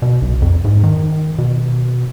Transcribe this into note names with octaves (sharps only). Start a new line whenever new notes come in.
B2
B1
F2
G#2
D#3
B2